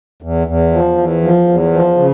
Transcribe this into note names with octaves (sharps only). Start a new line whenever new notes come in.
E2
E2
F3
E2
F3
E2
F3
C#3